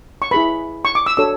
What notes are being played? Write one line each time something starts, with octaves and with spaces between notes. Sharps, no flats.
C#6
E4 G#4 B4 B5
C#6
D6
E6
D4 F#4 A4 C#5 E6